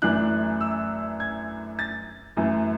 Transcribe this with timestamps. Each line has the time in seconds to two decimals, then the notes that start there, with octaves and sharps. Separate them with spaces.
0.02 F#2 E3 A3 D4 F#6
0.61 E6
1.20 G#6
1.79 A6
2.37 F#2 E3 A3